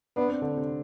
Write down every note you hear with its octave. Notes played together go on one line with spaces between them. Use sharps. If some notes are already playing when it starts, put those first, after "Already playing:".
B3 D4
C4
D3 D4
C3 C4